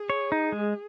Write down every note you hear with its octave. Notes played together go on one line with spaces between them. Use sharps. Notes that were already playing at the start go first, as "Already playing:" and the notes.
Already playing: G#4
C#5
D#4
G#3